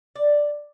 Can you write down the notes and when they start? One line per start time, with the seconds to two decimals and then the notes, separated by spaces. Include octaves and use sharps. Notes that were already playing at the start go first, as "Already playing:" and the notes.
0.16 D5